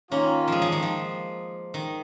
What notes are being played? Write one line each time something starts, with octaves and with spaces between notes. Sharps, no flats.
D#3 A#3 C#4 F4
F3 G#3
F3
D#3
F3
D#3